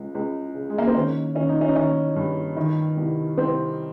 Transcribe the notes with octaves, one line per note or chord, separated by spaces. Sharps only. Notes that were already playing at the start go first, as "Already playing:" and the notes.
Already playing: C#2 C#3
C#2
C#3
G#3
A#3
C4
D#3 C#4
D#3 C#4
D#4
C#4
D#4
D#3 C#4
G2
D#3
C2
C2 C4